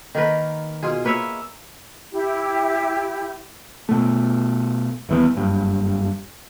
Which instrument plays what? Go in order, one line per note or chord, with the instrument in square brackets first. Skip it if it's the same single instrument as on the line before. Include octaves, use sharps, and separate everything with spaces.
[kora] D#3 A#3 A#4 B4
B2 F4 G#4
A#3 B4 C#5 E5
[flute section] E4 G4
[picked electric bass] B2 A3
D#1 E3 B3
F#1 G2